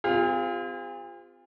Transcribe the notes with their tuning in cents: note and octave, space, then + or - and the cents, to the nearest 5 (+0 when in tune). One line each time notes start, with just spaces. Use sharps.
C4 -35 F4 +0 G#4 -45